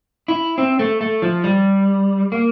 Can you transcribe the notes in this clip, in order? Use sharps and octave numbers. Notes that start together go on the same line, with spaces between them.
E4
C4
A3
A3
F3
G3
A#3